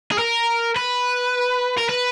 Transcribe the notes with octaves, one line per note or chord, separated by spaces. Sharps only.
G#4
A#4
B4
A#4
B4